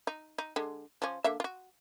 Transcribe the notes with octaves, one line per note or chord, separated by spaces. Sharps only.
D#4
D#4
D3 G#3
F3 C#4
D3 A#3 E5
F4 F#4